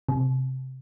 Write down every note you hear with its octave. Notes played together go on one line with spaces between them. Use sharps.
C3